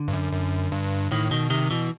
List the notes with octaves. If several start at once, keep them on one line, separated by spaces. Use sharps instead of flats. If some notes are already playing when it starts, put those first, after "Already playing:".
Already playing: D3
G2
F#2
F#2
G2
A2 D#3
B2 D#3
C3 D#3
B2 E3